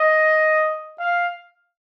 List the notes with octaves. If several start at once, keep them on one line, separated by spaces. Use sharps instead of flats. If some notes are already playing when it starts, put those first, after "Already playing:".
Already playing: D#5
F5